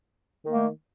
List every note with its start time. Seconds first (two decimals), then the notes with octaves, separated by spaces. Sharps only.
0.44 D#3
0.48 A#3
0.53 A3